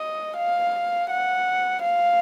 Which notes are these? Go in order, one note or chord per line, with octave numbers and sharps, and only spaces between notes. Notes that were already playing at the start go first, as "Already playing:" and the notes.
Already playing: D#5
F5
F#5
F5